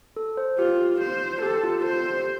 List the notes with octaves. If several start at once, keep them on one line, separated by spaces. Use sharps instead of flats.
A4
C5
F4 G4
C5
G4 A4
F4
G4 C5